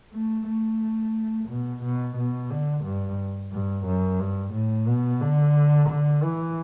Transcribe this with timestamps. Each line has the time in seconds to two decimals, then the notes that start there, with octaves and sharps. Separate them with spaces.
0.14 A3
0.48 A3
1.49 B2
1.83 B2
2.17 B2
2.50 D3
2.84 G2
3.52 G2
3.86 F#2
4.20 G2
4.54 A2
4.88 B2
5.21 D3
5.89 D3
6.23 E3